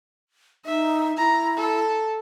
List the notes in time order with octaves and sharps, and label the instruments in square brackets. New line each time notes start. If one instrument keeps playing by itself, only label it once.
[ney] D#4 [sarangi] E5
[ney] E4 [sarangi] A#5
[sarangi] A4